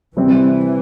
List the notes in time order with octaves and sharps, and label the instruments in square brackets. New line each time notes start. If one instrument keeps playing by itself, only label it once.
[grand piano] C3 G3 C4 [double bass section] E3